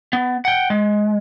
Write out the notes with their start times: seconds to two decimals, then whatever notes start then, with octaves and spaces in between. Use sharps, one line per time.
0.13 B3
0.45 F#5 G5
0.70 G#3